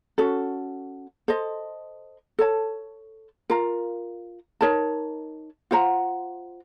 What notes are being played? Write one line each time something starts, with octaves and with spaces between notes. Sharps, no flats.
C#4 F#4 A4
A4 C5 D#5
A4 C#5 A5
F4 A#4 F5 A#5
D#4 A#4 C#5 A5
F4 C5 F#5 A#5